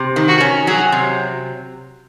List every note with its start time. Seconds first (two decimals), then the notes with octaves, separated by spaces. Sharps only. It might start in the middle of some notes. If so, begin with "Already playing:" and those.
Already playing: C3
0.16 D#3
0.28 F#4
0.40 C#4
0.67 F#3 G#4
0.92 C3